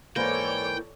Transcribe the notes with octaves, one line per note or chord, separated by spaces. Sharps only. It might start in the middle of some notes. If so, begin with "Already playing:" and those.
G#2 E3 A#3 A4 C#5 D5 G5